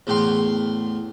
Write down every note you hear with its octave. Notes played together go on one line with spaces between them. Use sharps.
E2 A2 G5 C6